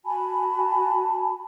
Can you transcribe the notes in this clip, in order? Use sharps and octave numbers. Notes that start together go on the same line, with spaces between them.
F#4 G#5 A5 B5